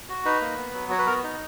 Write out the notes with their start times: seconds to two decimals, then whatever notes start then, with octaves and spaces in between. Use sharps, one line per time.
0.09 F#4
0.25 D#4 B4
0.41 A#3
0.57 B3
0.73 F#3
0.90 F#4 C#5
0.99 B4
1.06 B3 A#4
1.23 D#4